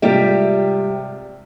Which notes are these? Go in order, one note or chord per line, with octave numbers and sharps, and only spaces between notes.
G#2 C3 G3 F4 G4 E5